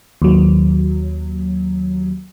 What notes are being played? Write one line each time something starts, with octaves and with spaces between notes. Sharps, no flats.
D#2 F#3